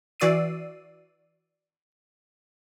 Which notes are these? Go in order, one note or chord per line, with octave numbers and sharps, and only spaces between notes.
E3 F#4 D5 E6 C7 D#7